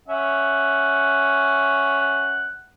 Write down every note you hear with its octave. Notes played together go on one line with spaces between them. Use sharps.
C#4 E5 F#5